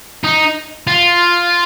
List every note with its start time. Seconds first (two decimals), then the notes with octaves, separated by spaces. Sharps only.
0.24 D#4
0.87 F4